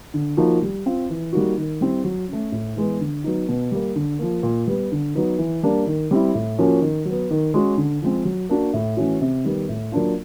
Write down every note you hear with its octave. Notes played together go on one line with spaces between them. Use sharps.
D3
F3 A#3 D#4 F#4
G3
C4 F4
E3
G3 A#3 D#4 F#4
D#3
G3 C4 E4
F#3
A3 C#4
A2
E3 G#3 B3
D3
F#3 B3 D#4
B2
G3 A#3
D3
F3 A#3
A#2
G3 B3
D3
F#3 B3 D#4
E3
G3 A#3 D4
D#3
G3 C4 E4
A2
F3 A#3 C#4 F#4
D#3
F#3
B3
D#3
G#3 C#4 F#4
D3
F3 G#3 C4
F#3
A#3 D4 F#4
A2
E3 A3 C#4 F#4
C3
D#3 G3 B3
A2
F#3 A#3 D4 F4